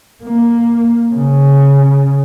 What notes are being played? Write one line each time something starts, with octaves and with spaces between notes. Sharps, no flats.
A#3
C#3